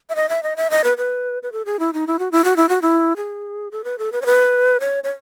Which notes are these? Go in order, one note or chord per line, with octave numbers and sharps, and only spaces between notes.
E5
D#5
E5
D#5
E5
D#5
B4
B4
B4
A4
G#4
E4
D#4
E4
F#4
E4
F#4
E4
F#4
E4
G#4
A4
B4
A4
B4
C#5
B4
C#5
C#5